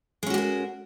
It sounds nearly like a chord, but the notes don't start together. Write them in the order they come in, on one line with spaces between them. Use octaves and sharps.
G#3 C#4 F#4 G4 A#4